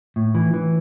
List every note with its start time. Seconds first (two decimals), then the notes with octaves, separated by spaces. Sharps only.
0.16 A2
0.35 E3
0.54 E3